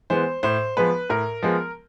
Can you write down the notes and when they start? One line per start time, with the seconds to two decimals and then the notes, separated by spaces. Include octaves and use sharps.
0.10 E3 G#3 B3 C5
0.43 A2 C5
0.77 F3 G#3 B3 B4
1.10 A2 A#4
1.43 F3 G#3 B3